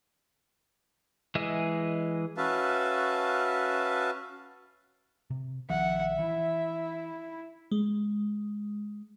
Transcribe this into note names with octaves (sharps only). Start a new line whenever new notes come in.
E3 G#3 G#4 D#5 E5
C#4 F#4 B4 E5 F5 A5
C3
A#1 D#3 F3 E5 F#5
E3 E4
G#3